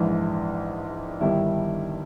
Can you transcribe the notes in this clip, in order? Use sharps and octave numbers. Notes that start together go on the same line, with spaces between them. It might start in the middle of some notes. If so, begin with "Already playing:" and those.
Already playing: A#1 G#2 E3
G1 G2 D#3 G3 E4